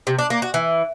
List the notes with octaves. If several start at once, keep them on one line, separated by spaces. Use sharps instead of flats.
C3
D4
A#3
F#4
E3